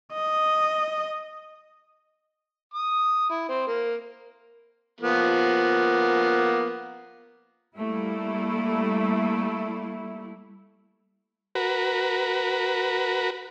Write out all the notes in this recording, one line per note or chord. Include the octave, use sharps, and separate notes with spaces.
D#5
D#6
E4
C4
A#3
F3 A#3 B3
G3 A3 A#3 E4
F#4 A#4 B4